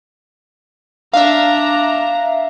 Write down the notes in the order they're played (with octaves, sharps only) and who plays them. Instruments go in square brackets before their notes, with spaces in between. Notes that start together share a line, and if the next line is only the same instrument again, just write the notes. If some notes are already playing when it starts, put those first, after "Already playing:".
[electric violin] D4 A#5 [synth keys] E5 F5